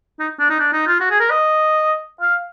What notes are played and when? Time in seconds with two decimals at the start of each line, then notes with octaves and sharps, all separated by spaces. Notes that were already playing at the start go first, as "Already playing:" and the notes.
0.20 D#4
0.39 D4
0.50 D#4
0.60 D4
0.73 D#4
0.87 F4
1.00 F#4
1.10 G#4
1.20 A#4
1.30 D#5
2.21 F5